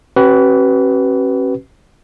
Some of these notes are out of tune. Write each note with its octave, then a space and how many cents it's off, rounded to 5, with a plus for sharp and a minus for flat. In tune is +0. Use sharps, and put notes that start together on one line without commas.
C#4 -40 F#4 +45 B4 +0